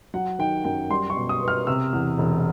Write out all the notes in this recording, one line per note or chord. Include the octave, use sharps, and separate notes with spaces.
F#3 F#5
D#3 G5
F#2 G5
G3 C6
C#6
B2
D#6
B3
F6
C3 E6
E2
E1